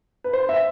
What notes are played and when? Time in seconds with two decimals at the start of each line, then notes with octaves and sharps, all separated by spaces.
0.24 B4
0.33 C5
0.49 E5